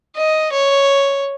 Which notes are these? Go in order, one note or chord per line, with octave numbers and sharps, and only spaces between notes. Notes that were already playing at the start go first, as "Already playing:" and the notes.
D#5
C#5